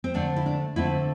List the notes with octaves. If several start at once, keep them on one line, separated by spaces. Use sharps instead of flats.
C4
D3 A3 C4 D4
E4
D4
D3 A3 C4 E4